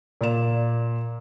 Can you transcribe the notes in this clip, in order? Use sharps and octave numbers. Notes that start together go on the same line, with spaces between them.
A#2 D5 E7